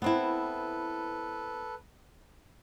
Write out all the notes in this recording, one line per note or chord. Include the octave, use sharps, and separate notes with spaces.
B3 C4 E4 A4 B4